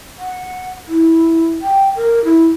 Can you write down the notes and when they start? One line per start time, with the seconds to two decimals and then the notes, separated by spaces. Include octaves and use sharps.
0.19 F#5
0.88 E4
1.62 G5
1.96 A#4
2.25 E4